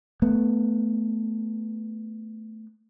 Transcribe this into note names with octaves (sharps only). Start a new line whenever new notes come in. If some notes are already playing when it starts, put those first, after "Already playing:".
A3 B3